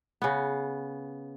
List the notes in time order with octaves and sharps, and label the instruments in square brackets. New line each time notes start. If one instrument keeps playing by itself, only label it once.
[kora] C#3 B3